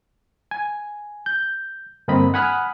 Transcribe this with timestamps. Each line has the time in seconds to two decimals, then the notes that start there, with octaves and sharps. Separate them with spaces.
0.51 G#5
1.26 G6
2.08 G2 D3 A#3 C4 D#5 B5
2.34 F#5 G#5 B5 D#6 F6 F#6